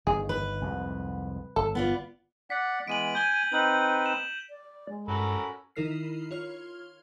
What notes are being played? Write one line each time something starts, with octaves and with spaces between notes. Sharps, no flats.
G1 D#3 G#4
B4
C2 F2 G#2
G1 A4
B3 F4 D5
D5 F#5 B6
E3 G#3 B3 D7 D#7 F#7
G#5 G6 G7
C4 D#4 B4 G6 F#7
E7
D5
G#3
G2 C#4 F#4 A4 A#4 B5
D#3 D#4 E4 A#4 F6 C7
F4 C#5 F6